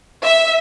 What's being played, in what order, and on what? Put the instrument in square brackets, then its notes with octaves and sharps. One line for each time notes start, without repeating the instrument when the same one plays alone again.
[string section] E5